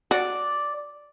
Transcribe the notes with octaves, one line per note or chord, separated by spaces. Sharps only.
F#4 D5